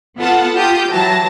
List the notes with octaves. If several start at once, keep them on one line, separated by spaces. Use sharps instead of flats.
B3 F4 A4 F#5 A5
F4 G4 D#6 G6
E3 F#3 A5 A#6